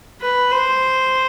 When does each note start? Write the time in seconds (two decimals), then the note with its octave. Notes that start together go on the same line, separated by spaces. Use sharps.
0.21 B4
0.52 C5